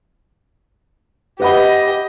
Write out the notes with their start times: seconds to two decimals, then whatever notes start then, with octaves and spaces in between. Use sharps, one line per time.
1.40 G4 B4 D#5 F#5 B5